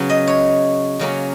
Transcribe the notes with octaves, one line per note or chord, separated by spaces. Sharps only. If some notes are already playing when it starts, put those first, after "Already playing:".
Already playing: C#3 F#3 B3
D#5
C#5
C#3 F#3 A#3 C#4